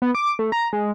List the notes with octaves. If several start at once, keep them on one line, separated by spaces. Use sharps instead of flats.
B3
D6
A3
A#5
G#3